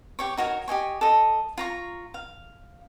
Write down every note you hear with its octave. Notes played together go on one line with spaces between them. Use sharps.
G4 C#5 C#6
D#4 F#4 A#4 C#5
G4 D#5 G#5 C#6
A4 D#5
F4 A#5 C#6
F5